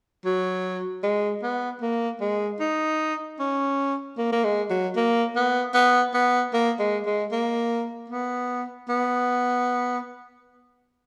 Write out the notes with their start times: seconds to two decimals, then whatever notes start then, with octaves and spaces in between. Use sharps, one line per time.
0.25 F#3
1.03 G#3
1.43 B3
1.82 A#3
2.21 G#3
2.60 D#4
3.40 C#4
4.18 A#3
4.32 A#3
4.44 G#3
4.70 F#3
4.96 A#3
5.36 B3
5.74 B3
6.14 B3
6.53 A#3
6.79 G#3
7.06 G#3
7.32 A#3
8.10 B3
8.89 B3